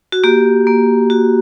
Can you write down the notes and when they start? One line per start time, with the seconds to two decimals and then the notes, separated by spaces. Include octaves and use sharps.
0.12 F#4
0.24 A#3 G4
0.67 A#3
1.10 F#4